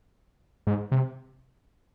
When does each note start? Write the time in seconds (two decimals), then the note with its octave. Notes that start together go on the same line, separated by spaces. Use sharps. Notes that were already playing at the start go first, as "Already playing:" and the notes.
0.67 G#2
0.92 C3